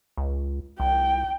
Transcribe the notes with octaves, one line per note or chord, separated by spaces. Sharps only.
C#2
C2 G5